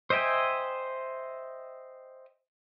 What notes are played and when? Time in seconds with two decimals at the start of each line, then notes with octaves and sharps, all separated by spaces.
0.10 C5 D#5 E5 G5 G#5